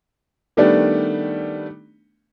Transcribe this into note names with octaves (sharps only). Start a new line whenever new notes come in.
D#3 G3 A3 B3 D4